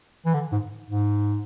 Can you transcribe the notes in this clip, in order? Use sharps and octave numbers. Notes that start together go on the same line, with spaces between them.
E3
D3
G#2
G#2